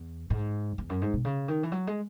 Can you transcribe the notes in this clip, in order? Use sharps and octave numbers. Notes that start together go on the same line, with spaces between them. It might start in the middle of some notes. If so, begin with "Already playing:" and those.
Already playing: E2
G#2
E2
F#2
G#2
B2
C#3
D#3
E3
F#3
G#3